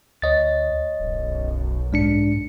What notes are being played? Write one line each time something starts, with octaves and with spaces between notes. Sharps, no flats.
D2 C#5 D#5 A6
D1 B1 F#2
G#2 G#3 D4 C#7